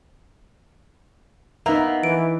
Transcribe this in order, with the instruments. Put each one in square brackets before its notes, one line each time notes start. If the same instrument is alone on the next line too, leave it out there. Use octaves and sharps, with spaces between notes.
[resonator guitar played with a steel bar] A#3 B3 [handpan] D#4 E5 [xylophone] A#5
[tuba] E3 [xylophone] D7